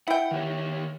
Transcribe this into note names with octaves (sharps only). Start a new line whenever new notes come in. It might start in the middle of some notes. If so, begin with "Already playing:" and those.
E4 F#5 G5
D#3 G4 C#5